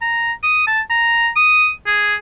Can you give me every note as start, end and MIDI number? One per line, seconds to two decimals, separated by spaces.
0.01 0.32 82
0.43 0.64 87
0.67 0.81 81
0.90 1.29 82
1.36 1.70 87
1.87 2.15 68